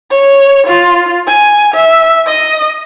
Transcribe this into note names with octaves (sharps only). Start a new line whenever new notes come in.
C#5
F4
G#5
E5
D#5